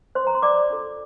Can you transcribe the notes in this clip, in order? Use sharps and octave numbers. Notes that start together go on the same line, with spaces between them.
C5 C6
A#5
C6
D5 D6
D4 F4 A4